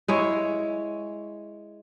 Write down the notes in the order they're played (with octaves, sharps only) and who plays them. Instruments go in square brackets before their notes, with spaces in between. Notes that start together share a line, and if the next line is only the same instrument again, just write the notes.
[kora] G#3 E4 C#5